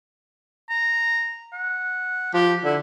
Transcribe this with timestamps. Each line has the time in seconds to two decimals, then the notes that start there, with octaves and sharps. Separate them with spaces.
0.70 A#5
1.53 F#5
2.34 F3 G4
2.64 D3 E4